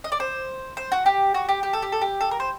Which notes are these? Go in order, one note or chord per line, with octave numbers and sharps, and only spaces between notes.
D#5
D5
C5
C5
F#4
G4
F#4
G4
G4
A4
G4
A4
G4
A4
A#4
C5